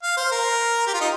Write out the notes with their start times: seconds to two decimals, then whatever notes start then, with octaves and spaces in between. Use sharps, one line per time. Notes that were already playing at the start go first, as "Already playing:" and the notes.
0.03 F5
0.17 C5
0.32 A#4
0.87 G4
0.94 F4
1.01 D#4